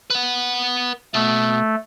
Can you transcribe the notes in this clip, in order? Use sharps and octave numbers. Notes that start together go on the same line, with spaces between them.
B4 F#5
B2 A3